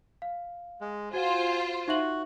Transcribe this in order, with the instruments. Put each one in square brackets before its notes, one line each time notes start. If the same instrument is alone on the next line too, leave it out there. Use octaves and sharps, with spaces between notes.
[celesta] F5
[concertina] G#3
[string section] F4 C5 [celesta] F#4 F#5 [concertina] G#5
[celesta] D#4 E5 F#7 [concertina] F#4